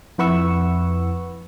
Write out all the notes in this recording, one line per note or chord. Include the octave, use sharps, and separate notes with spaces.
F2 E4 B4 F#5 C#6 E6